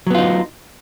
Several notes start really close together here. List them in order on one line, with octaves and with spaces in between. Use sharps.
F#3 B3 F4 D#4